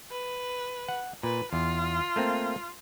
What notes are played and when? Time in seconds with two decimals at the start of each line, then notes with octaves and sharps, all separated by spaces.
0.11 B4
0.88 F#5
1.23 A#2 B4
1.53 E2 F4
2.16 A3 A#3 C4